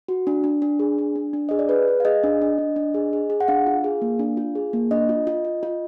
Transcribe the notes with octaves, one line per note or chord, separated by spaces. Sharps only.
F#4
D4
D4
D4
G#4
D4
D4
D4
G#4 D#5
D5
G#4 B4
G#4
F5
G#4 D#5
D4
D4
D4
D4
G#4
G#4
G#4
F#5
D4 F5
F4
G#4
A#3
D4
F4
G#4
A#3
D4 D#5
F4
F4
F4
F4